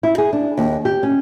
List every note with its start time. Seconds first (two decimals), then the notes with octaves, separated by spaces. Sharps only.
0.03 E4
0.18 G#4
0.33 D4
0.57 D#2
0.85 G4
1.03 C#4